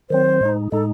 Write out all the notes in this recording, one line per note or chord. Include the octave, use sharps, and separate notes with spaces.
D#3 F#3 C4 C5
A2 G#3 D#4
A2 G#3 D#4 A4